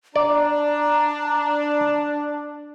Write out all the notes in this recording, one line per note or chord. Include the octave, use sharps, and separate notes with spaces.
D4 D5 A#5